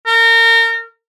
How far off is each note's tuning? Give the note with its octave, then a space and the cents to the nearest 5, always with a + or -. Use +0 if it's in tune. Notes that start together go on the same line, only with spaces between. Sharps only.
A#4 -30